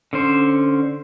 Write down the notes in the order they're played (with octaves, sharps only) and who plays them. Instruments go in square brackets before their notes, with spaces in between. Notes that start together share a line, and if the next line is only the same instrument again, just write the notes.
[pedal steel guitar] D3 C#4 C5